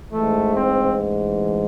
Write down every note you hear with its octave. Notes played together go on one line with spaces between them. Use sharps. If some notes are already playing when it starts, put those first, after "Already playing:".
A1 G#2 E3 A3
C4